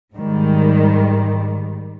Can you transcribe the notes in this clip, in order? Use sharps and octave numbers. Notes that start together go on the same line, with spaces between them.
G#2 D#3 G3